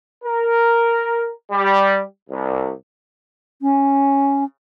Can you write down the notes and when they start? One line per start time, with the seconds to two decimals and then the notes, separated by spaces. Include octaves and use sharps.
0.24 A#4
1.51 G3
2.29 C2
3.62 C#4